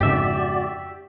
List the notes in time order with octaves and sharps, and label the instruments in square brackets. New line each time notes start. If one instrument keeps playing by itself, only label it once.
[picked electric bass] F2 G#2 C#3 [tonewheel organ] F#4 D5 [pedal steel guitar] G4 E5